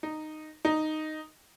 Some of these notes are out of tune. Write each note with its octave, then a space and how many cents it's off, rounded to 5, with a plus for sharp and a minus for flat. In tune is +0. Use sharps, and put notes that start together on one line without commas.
D#4 -10
D#4 -5